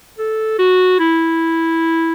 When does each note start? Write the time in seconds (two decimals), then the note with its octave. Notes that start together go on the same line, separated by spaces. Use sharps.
0.18 A4
0.59 F#4
0.99 E4